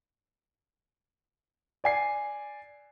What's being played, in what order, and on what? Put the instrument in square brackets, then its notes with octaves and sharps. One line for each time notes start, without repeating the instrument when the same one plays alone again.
[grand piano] D5 G#5 C7